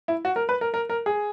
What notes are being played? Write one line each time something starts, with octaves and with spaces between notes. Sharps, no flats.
E4
F#4
A#4
B4
A#4
A#4
A#4
G#4